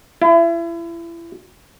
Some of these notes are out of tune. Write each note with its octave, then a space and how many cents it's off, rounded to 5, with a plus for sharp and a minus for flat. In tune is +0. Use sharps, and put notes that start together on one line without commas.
E4 +30